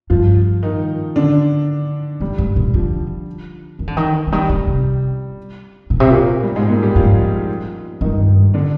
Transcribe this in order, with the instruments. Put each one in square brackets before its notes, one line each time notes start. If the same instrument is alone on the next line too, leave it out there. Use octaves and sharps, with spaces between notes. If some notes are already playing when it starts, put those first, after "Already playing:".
[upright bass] G2 [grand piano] F3 F4
[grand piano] D#3 D#4
D3 D4
[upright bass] F2 [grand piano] G3
[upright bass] G2
A#2
[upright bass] D3 [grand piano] F3
[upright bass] D#3
D3
D#3
D3
[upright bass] D#3 [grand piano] G3
[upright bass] D3
C3
A#2
C3
A#2
[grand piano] G3
G#2 G#3
A#2 A#3
G3 G4
[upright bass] G#2 [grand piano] F3 F4
[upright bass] G2 [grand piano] D#3 D#4
[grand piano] D3 D4